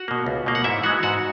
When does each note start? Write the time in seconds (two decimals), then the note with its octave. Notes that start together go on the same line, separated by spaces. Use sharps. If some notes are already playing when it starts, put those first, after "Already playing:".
Already playing: F#4 F#5
0.08 B2 A#3
0.26 C#2
0.46 B2 A#3
0.55 F#5
0.64 G#2 E4 E5
0.83 E3 G#3 F#4 F#5
1.03 G#2 F#4 F#5